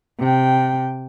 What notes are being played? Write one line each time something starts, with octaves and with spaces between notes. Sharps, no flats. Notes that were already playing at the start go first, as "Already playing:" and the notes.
C3 G5